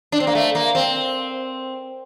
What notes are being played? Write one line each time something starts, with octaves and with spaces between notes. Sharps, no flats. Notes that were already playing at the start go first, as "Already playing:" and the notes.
D4
C4
A#3
A3
A#3
C4